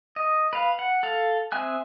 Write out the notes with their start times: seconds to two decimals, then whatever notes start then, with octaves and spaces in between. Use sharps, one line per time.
0.16 D#5
0.53 B4 F5
0.79 F#5
1.03 A4 F5
1.52 C4 G#4 E5 G#5 F#6